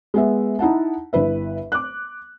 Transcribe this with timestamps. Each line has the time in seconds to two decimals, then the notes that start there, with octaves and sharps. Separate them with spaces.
0.14 G#3 B3 E5
0.59 D#4 E4 F#5 A5
1.13 G1 E4 B4 E5
1.72 D6 F#6